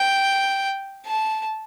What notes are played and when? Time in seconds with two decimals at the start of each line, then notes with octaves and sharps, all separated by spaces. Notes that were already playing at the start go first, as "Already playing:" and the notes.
Already playing: G5
1.06 A5